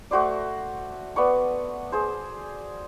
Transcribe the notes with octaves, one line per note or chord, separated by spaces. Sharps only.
A3 F#4 C5 D5
B3 D5 C#6
G#4 C5